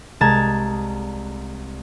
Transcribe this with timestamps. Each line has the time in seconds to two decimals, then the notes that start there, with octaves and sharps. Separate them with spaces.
0.20 C2 G#3 A5 A#5 G#6